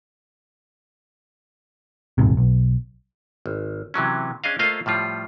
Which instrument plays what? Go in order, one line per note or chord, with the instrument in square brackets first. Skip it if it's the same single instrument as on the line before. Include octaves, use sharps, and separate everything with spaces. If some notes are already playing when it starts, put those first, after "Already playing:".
[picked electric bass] D#1 A1 G#2 C3
B1
[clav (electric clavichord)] G#1
C3 E3 F#3 C#4
C#4 D4 G#4 D#5 F5
A3 A#3 F4 C5 D#5 F5
A2 F3 G3 F4